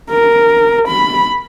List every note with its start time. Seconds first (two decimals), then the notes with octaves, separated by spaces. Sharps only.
0.10 A#4
0.88 B5